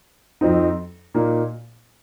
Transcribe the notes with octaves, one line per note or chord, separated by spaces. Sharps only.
F2 F3 C4 D#4
A#2 A#3 D#4